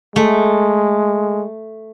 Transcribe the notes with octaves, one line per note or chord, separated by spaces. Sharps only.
G#3 A3